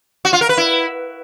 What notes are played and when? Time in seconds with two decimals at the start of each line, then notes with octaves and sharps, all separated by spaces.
0.25 F#4
0.33 F4
0.41 A#4
0.49 B4
0.57 E4